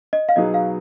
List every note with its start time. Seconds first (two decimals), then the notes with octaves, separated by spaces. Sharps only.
0.13 D#5
0.29 F5
0.36 B2 F#3 B3 D#4 G#4 D#5
0.54 F5